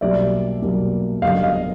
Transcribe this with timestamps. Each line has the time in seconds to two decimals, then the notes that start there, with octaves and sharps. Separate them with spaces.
0.01 B1 B2 G3 A#3 D5 E5
0.62 B1 B2 G3 A#3
1.22 F#1 F#2 D3 G3 B3 D#5 F5
1.43 D#5 F5